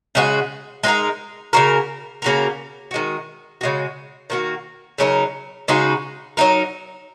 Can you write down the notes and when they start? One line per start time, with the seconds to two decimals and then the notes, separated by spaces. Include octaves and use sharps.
0.15 C#3 G#3 F#4
0.83 G#3 D#4 F#4 A#4
1.53 C#3 A#3 F#4 A#4
2.22 C#3 A#3 F#4 A#4
2.91 D#3 G#3 F#4
3.61 C#3 G#3 F#4
4.30 D#3 A#3 F#4
4.98 C#3 F#3 D#4 A#4
5.68 C#3 G#3 D#4 F#4
6.37 F#3 D#4 A#4